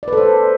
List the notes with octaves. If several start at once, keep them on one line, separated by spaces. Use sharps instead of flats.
A4 B4 C5 D5